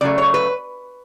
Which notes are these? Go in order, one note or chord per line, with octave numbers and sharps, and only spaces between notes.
C#3 F#3 A3 D5
C#5
B4